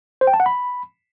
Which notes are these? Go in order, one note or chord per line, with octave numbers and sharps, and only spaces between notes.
C5
G5
A5
F#5
B5